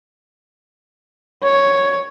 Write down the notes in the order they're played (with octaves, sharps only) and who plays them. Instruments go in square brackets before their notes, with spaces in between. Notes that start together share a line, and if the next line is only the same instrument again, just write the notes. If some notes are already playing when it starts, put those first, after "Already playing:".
[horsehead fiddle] C#5